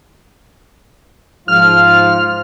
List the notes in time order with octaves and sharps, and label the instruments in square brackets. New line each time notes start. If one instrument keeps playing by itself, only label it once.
[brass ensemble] G#2 F3 F4 [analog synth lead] F6